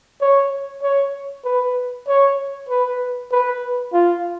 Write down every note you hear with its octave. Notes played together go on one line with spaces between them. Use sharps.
C#5
C#5
B4
C#5
B4
B4
F4